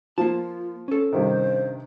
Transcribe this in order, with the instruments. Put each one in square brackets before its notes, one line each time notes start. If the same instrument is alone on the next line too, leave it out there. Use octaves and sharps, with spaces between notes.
[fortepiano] F3 [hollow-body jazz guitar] A#3 A5 [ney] F4
[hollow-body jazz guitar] C#4 A4
[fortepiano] G2 C3 D#3 [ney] C5